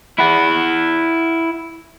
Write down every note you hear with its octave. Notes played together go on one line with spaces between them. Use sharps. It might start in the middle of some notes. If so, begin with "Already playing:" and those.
E4 F#5